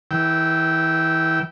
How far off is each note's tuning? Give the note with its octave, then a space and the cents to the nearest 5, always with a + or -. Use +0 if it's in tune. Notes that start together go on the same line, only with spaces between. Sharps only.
E3 -25 G5 -15 E6 +0